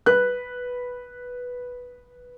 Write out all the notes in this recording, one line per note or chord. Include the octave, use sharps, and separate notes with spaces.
B4 F#6